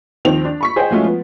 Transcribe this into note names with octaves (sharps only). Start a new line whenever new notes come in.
D#2 D#3 F3 C4 F7
D4
B5 C#6 B6
G#4 C5 C#5 D#5 F#5 G5
F3 G#3 A3 C#4 F4 F#4
F3 B3